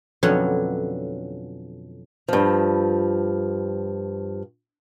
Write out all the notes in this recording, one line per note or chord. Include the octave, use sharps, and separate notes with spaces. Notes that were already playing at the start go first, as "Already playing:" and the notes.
F2 B2 D3 F#3 C#4 F#4
G2 F3